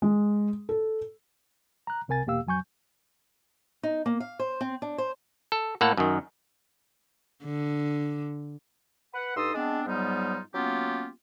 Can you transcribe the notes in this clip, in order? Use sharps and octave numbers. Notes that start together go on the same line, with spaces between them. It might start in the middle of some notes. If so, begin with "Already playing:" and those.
G#3
A4
A#5 F#6
C2 C3 A#4 G#5 A6
E2 B2 A#3 G4 F5 E6
F2 F#3 G#5 C#6 G6
D#4
A#3
F5
C5
C4
D4
C5
A4
A2 A#3 A4 F#5
F#2 D#3
D3
B4 F#5
G2 D#4 A4 C6 D#6 E6
G#3 B3 C4 D4
G#2 F#3 G3 B3 D#4 F4
F#3 A#3 B3 C#4 F4 G4